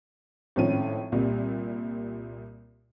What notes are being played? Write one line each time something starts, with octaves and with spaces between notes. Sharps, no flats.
G#1 A2 F3 C#4 D#7
C2 A#2 G3